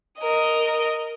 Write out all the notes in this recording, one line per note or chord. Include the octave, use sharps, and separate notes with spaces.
A#4 D#5